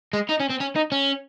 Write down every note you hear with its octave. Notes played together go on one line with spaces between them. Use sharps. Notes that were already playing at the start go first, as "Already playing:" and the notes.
G#3
D#4
C#4
C4
C#4
D#4
C#4